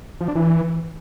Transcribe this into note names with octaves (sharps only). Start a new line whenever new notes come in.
F3
D4
E3